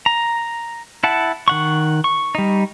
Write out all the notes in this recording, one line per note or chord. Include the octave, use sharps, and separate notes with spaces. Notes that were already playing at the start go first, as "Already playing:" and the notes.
A#5
E4 F#5 A5
D#3 F#5 C#6
C#6
G3 D#4